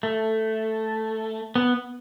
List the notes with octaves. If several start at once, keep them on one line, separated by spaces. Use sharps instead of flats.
A3
B3